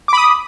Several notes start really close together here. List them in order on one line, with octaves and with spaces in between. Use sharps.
D6 B5 D#6